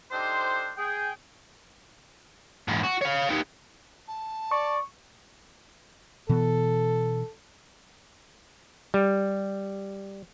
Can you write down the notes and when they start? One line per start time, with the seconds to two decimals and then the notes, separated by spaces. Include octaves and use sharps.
0.11 D4 D#4 G4 A4 C5
0.77 G#4 G5
2.68 E2 G#2
2.84 F#4
3.02 C#5 F5
3.29 D#4 G4
4.08 A5
4.51 D5 C#6
6.29 B2 E3 B3 A4
8.94 G3